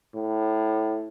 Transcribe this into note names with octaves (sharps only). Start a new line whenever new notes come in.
A2